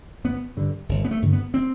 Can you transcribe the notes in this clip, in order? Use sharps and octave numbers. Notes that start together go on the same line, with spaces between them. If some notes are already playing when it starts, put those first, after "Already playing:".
G1 B3
G2 D3
G1
B3
A3
G2 D3
B3
C4